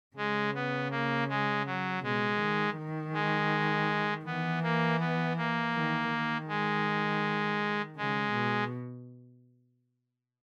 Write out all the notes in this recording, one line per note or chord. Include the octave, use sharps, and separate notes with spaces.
C#3 G#3
B3
A#3
G#3
F#3
B2 G#3
D#3
D#3
G#3
E3 B3
A#3
B3
A#3
D#3
D#3
G#3
C#3 G#3
B2